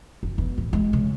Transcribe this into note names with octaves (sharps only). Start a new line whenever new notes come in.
F#1
E2
A2
G#3
C#3